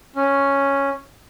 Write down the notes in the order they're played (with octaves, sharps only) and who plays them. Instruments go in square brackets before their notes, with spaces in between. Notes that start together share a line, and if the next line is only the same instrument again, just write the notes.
[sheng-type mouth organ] C#4